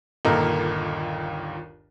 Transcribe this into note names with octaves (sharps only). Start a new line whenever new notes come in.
G1 D#2 A#2 A4 A#4 D#5